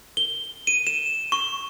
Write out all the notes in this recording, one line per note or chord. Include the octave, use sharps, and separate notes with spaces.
G7
D#7
E7
C#6